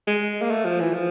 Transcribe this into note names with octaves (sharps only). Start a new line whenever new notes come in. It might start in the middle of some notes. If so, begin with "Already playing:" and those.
G#3
A#3
A3
F3
E3
F3